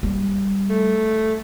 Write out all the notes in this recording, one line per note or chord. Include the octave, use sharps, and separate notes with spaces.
G3
A3